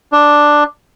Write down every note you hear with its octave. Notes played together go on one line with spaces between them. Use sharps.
D4